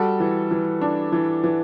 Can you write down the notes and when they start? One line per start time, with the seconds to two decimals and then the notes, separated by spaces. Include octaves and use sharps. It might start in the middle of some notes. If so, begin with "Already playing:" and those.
Already playing: G3 F#4 A4
0.20 E3
0.51 E3
0.81 D4
1.12 E3
1.44 E3